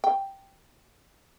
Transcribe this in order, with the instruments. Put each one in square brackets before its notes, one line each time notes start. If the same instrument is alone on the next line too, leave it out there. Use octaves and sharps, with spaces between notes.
[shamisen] G5